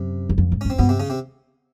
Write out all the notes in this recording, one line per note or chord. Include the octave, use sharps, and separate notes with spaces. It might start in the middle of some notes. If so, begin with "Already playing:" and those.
Already playing: F#2 C3
E2
F2
G#2
F2 C#4
C4
G2 B2 B3
C3 C4
C#3 C#4
C3 C4